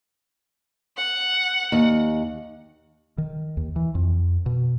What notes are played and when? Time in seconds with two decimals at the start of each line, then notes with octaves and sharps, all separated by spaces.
0.97 F#5
1.72 D#2
3.18 D#3
3.57 D#2
3.76 E3
3.95 F2
4.46 B2